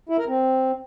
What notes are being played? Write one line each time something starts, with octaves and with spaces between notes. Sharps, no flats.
E4
A#4
C4